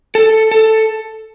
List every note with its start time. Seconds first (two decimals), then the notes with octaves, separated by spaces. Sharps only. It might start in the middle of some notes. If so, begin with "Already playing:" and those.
0.15 A4
0.51 A4